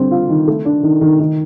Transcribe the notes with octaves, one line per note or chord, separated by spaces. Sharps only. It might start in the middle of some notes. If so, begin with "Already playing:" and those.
Already playing: D3 G3 C4
F4
D#3
A3
D4
D#3
D#3
D#3